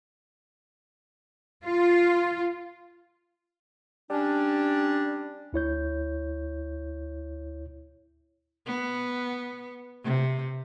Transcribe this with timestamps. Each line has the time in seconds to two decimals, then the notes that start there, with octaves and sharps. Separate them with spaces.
1.65 F4
4.10 G3 C#4 D4
5.53 D2 E4 C#5 G6
8.66 B3
10.04 C3